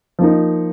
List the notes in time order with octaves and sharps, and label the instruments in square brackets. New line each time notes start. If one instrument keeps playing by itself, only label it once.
[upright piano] F3 A#3 D#4